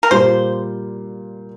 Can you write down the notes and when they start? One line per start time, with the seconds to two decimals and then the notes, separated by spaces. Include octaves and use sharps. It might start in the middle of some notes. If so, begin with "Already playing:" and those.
0.03 A#4
0.11 A#2 G3 A#3 F4 C5